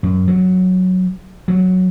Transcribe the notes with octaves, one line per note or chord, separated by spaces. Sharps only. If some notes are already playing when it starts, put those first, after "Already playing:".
F#2
F#3
F#3